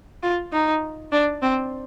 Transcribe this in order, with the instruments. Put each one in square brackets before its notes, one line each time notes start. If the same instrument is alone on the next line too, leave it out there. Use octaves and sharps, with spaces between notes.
[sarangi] F4
D#4
D4
C4